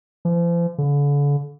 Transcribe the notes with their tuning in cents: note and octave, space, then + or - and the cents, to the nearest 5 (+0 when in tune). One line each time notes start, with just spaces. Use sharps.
F3 -40
D3 -40